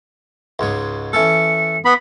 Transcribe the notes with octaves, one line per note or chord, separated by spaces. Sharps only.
C#2 G#2 C#5
E3 C#4 A4 C#7
B3 B5